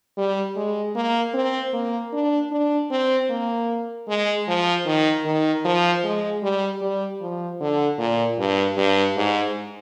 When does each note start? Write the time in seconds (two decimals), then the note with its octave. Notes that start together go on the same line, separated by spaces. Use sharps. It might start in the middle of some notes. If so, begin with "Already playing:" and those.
0.17 G3
0.56 G#3
0.96 A#3
1.34 C4
1.73 A#3
2.13 D4
2.52 D4
2.91 C4
3.30 A#3
4.08 G#3
4.48 F3
4.86 D#3
5.25 D#3
5.65 F3
6.04 G#3
6.43 G3
6.81 G3
7.21 F3
7.60 D3
7.99 A#2
8.38 G2
8.77 G2
9.17 G#2